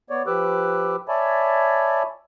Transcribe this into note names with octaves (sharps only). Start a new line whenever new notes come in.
B3 C#5 D5
F3 G4 B4 D6 E6 F#6
C#5 D5 E5 G#5 A5 B5